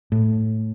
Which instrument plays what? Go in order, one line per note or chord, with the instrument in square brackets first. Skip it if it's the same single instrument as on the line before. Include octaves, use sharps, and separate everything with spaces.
[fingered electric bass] A2